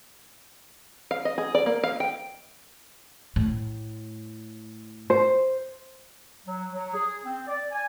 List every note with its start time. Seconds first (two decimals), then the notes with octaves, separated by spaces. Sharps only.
1.11 F5
1.25 D#5
1.38 G#4
1.55 D5
1.66 A#3
1.84 F5
2.00 G5
3.36 A2
5.10 C5
6.46 F#3
6.73 F#3
6.94 G#4
7.24 C4
7.48 D5
7.71 G#5